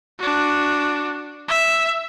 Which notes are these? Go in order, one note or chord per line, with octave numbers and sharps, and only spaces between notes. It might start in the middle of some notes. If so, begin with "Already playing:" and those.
D4 F#4
E5